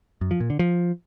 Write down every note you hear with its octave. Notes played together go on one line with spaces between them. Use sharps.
F#2
F3
A#2
D3
F3